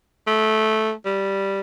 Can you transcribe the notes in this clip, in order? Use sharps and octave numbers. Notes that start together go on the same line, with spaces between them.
A3
G3